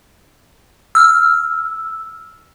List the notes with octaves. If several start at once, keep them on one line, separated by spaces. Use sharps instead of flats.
E6 F6